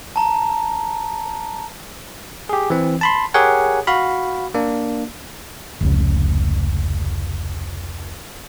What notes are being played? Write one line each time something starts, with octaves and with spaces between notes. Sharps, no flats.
A5 A#5
G4 G#4
E3 C4
A5 B5 C6
G4 G#4 A#4 C#5 F#5 G#5
F#4 F5 B5
A#3 D4
F1 C#2